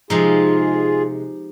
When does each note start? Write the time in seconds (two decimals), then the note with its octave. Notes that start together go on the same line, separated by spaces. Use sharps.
0.10 C3 F3 G#3 D#4 F4 G#4